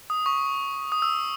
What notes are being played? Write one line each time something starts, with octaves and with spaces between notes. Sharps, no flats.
D#6
C#6
D#6
E6